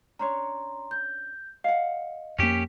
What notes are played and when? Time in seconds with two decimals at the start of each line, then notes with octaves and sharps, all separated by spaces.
0.19 C#4 D4 C#5 A#5 C6
0.91 G6
1.64 D#5 F5 F#5
2.39 F2 A#3 C#4 G4 B6